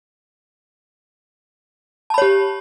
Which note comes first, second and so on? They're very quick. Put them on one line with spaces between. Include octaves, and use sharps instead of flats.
A5 B5 C#5 G4